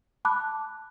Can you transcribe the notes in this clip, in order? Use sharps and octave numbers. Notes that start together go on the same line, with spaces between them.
A5 B5 D6 F#6